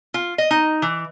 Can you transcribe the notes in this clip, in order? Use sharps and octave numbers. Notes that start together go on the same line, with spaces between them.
F4
D#5
D#4
E3